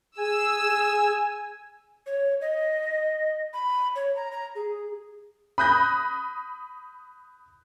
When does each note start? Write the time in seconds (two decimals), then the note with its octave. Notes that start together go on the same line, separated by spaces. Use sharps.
0.18 G#4 G#5 E6
2.06 C#5
2.41 D#5
3.53 B5
3.95 C#5
4.16 A#5
4.32 A#5
4.56 G#4
5.58 B5 D#6 F#6 G6 A#6